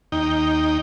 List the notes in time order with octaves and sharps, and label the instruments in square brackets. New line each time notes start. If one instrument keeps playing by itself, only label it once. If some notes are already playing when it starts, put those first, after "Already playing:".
[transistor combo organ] D#2 D#4 G5